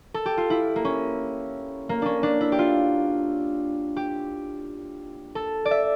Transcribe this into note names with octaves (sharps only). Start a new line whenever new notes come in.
A4
G4
F4
E4
A#3
C#4
A#3
C#4 D4
D4
E4
G4
F4
G4
A4
D5
E5